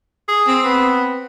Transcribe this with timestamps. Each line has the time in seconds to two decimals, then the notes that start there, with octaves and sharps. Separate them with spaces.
0.28 G#4
0.47 C4
0.64 B3